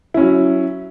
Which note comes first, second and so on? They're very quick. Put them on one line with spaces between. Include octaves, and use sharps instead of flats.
E4 C#4 F#3